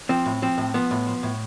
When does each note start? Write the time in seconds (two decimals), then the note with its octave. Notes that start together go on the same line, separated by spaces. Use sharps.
0.09 F3 C4
0.26 A2
0.42 F3 C4
0.58 A2
0.74 F3 B3
0.91 A2
1.07 F3
1.23 A2